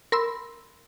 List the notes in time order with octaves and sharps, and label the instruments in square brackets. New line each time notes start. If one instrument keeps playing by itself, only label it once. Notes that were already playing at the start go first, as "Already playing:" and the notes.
[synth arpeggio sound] A#4 B5 C6 E6